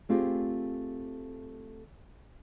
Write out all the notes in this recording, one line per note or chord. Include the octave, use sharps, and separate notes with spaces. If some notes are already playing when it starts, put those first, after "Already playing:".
A3 C4 F4 G4 G#4